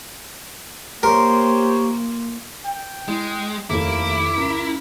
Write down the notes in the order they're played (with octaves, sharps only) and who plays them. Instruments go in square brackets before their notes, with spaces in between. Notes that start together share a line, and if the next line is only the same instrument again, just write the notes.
[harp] F3 C6 D6 [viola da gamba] A#3 [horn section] G4 C5 C#5 [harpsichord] A#4
[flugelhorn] G5
[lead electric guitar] G#3 [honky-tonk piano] E4
[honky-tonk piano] F1 D#2 A3 [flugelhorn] A#3 [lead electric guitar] E4 [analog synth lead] D6
[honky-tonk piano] C#2 [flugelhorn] A#4